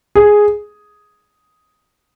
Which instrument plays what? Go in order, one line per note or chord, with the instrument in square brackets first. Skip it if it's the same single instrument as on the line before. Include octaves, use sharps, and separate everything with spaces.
[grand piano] G#4